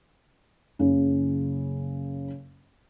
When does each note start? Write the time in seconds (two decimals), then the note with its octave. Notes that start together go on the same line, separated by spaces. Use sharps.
0.79 F#1 C#3